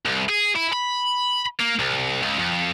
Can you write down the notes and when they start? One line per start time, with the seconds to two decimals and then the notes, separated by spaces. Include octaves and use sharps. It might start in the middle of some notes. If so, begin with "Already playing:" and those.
0.06 C2
0.29 G#4
0.56 E4
0.73 B5
1.60 A#3
1.79 C2
2.22 C#2
2.39 F2